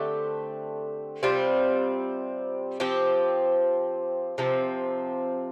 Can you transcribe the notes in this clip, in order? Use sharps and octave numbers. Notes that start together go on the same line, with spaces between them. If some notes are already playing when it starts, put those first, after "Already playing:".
Already playing: D3 A3 C4 G4
C3 G3 C4 F4
F3 C4 G4
C3 F3 C4